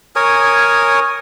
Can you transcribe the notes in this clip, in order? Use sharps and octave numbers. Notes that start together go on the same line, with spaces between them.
A#4 C#5 G#5 D#6